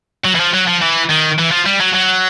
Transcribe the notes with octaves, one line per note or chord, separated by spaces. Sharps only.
F#3
E3
F3
F#3
F3
E3
D#3
E3
F3
G3
F#3
F#3